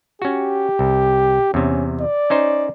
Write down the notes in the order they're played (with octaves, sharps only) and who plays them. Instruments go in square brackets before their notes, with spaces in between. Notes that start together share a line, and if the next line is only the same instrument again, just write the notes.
[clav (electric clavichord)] C#4 F#4 [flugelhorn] G4
[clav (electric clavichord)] C2
[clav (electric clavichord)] E2 C3 [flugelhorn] C#4
[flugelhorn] D5
[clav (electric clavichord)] C#4 D#4 C5